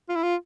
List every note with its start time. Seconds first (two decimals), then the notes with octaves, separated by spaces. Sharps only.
0.09 F4
0.15 E4
0.23 F4